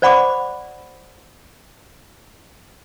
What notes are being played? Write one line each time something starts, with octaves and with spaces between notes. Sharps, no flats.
C5 D5 F#5 B5 C#6 D6